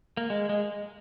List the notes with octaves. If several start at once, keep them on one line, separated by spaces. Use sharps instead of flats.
A#3
G#3
G#3